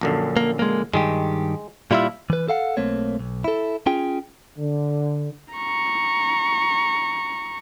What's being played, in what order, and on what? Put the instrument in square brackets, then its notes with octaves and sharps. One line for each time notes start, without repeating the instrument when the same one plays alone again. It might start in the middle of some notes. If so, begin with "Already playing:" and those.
[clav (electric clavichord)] A#1 F#2 D3
[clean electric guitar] A#3
G#3 A#3
[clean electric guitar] G2 D#3 G4 [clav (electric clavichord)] G#3
[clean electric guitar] A#2 G3 E4 [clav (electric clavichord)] F4 E5
[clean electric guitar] E3 B4
A4 F5 F#5
B1 A3 A#3 C4 C#5
B1
E4 A4
C#4 F4 G#4 G5
[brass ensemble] D3
[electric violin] A#5 C#6